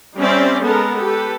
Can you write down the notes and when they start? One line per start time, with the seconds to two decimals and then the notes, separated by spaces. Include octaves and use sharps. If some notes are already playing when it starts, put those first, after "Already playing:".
0.18 G3 C4 C#4 C5 D5 E5
0.63 G#3 B3 A4 A#4 A5
0.98 G4 A4 B4